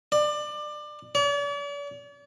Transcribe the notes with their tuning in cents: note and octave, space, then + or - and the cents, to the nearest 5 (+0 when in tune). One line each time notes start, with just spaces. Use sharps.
D5 +25
D5 -45